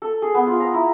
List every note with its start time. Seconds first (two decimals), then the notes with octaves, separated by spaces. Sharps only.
0.02 A4
0.22 G#4
0.34 B3
0.47 F4
0.60 A#5
0.74 E4